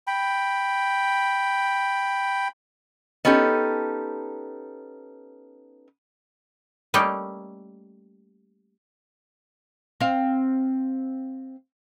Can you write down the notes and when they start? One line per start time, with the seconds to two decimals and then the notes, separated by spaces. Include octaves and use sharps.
0.07 G5 B5
3.25 B3 C#4 D#4 G4 A4
6.94 G3 A3 A#3 C#4 D#4 G4
10.00 C4 F5